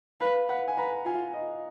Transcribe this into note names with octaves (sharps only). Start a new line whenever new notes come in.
B4 F5
B4 F#5
G#5
B4 A#5
F4 G#5
D#5